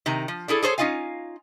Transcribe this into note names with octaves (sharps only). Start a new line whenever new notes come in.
C3 D#3 A#5
F3
D4 E4 G#4 A4
G#4 A4 C5 C#5
C#4 D#4 F4 F5 G#5